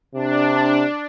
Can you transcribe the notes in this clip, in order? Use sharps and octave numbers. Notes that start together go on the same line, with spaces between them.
C3 D4